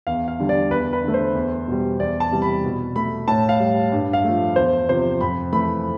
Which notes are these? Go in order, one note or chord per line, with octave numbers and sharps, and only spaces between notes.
E2 F5
F5
D3 G3
D5
E2 B4
B4
D3 A3
C5
E2
B2 G3
E2 D5
A5
C3 E3 G3
B5
B2
A3 B5
A2 A5
F5
G3
G2
F5
F3 A3
E2 C5
C3 F3 C5
F2 B5
E3 A3 B5